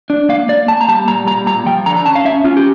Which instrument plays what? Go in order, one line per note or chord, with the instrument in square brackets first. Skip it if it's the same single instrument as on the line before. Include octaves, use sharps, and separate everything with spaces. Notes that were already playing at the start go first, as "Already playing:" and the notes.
[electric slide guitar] D4
A#3 F5
A#3 D5
A#3 A5
A#5
G3 A5
A#2 A#5
G3 A#5
A#2 A#5
F3 G5
D3 A#5
A#5
C#4 A5
F5
C#4 E5
C#4 F4
G4